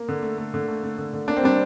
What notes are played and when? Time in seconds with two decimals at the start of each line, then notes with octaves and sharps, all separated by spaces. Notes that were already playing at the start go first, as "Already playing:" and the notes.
Already playing: A#3
0.09 D3
0.23 A3
0.38 A3
0.54 D3
0.68 A3
0.83 A3
0.98 D3
1.13 D3
1.28 A#3 D4
1.36 C4
1.43 G3 D4